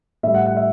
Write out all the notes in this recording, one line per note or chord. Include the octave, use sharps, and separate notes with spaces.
A2 G3 E5
F#5
F#5
E5